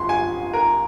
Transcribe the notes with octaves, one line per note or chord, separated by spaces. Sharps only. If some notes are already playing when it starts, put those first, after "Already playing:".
Already playing: G1 F2 C6
G#5
A#4